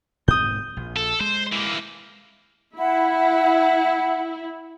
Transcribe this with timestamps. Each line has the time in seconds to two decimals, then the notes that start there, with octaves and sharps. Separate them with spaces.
0.28 G#2 C4 D#6 G6
0.77 A#1
0.96 A4
1.20 G#3 C5
1.52 E3 A#3
2.78 E4 E5 F#5 B5